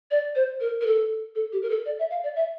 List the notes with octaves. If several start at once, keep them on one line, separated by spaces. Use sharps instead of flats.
D5
C5
A#4
A#4
A4
A4
G4
A#4
A4
D5
E5
F5
D5
E5